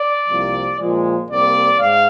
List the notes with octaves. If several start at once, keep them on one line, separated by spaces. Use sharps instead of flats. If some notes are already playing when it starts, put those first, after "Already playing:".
Already playing: D5
C2 C3 F3 A#3
A#2 F3 G#3
C2 C3 G3 A#3 D5
G#2 F5